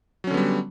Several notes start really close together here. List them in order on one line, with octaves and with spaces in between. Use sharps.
F#3 C#4 D3 B3 G3